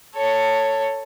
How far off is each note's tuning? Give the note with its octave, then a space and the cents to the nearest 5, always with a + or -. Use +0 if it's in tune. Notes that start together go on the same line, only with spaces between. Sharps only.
A4 +15 C#5 +5